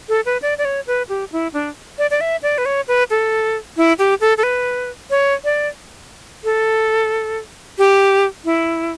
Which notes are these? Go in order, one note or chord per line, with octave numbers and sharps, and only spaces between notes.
A4
B4
D5
D5
C#5
B4
G4
E4
D4
D5
D5
E5
D5
B4
C#5
B4
A4
E4
G4
A4
A4
B4
C#5
D5
A4
G4
E4